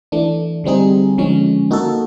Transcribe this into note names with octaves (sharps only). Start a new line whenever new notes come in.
E3 A3 D4
D3 G3 C4 D#4 G#4
D3 F3 G#3 C#4
A#3 D#4 F#4 A4